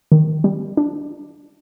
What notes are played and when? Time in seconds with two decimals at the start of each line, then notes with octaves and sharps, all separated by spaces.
0.12 D#3
0.44 G3
0.77 D4